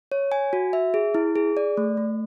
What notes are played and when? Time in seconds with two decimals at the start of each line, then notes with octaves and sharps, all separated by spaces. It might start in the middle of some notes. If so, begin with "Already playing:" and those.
0.12 C#5
0.32 G#5
0.53 F#4
0.73 E5
0.94 G#4
1.15 E4
1.36 G#4
1.57 D5
1.77 A3
1.97 A3